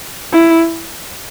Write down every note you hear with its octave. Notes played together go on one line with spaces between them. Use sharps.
E4